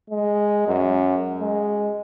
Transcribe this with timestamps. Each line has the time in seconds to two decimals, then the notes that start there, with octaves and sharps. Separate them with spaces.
0.10 G#3
0.68 F#2
1.41 G#3